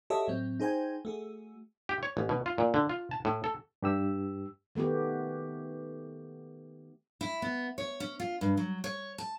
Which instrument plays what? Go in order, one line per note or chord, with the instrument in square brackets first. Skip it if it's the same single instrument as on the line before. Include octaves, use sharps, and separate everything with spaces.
[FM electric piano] F#4 G4 A4 C#5 D#5 E5
A2 F#3 C4
D#4 G#4 C5 G5 G#5
A3 F#4 G#4
[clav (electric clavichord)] G4
C#5
A1
B2
F4
A#2
D3
F4
A5
A2
A4
[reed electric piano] G2 G4 E6
[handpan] D#3 A3 B3 F#4 G4
[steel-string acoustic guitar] E4
B3
C#5
C#4
F4
G2
F#3
C#5
A5